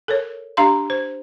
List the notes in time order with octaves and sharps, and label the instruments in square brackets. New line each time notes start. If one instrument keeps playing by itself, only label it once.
[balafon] A4 A#4 C#5
D4 G4 F5 A#5 C6
C5